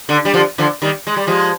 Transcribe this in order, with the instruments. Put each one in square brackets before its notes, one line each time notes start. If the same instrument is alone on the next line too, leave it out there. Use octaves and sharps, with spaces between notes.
[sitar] D3
G3
D3 F3
D3 F3
D#3 G3
G#3
G3
F3 G#3